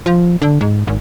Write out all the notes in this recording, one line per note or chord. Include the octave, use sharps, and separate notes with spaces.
F3
D3
G#2
G#1